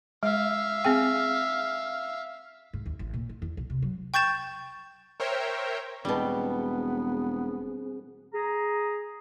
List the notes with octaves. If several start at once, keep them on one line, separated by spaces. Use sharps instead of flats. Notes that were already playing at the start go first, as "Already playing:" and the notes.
G#3 E5 F5
C4 G#4 G5
G#2
D#2
A1
A#2
D#3
E2
B1
C3
F#3
G5 C#6 G6 A6 E7
A#4 C5 C#5 E5 G5
E1 B2 G3 B3 C4 G#4
G#4 A#5